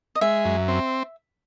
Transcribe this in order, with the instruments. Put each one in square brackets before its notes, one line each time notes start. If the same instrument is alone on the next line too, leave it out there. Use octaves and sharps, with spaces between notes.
[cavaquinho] D#5
[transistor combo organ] G#3 [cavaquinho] E5
[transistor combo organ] F#2
C4